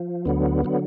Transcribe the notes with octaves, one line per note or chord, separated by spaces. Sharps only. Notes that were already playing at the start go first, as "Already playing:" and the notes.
Already playing: F3
D2 D3 F#3 B3
D3 F#3